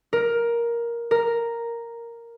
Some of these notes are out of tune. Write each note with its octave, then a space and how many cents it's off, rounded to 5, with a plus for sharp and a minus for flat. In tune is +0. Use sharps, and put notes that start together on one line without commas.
A#4 +10
A#4 +0